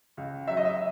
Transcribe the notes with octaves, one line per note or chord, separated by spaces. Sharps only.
C#2
F#3 E5
D#5
E5